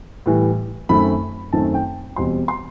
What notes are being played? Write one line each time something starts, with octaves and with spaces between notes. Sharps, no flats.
A2 E3 G3
F#2 D#3 A3 C4 B5
F#2 D#3 A3 C4 A5
G5
E2 B2 G3 C4 C6
C6